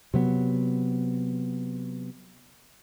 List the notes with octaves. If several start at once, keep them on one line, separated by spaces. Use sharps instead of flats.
C3 F#3 B3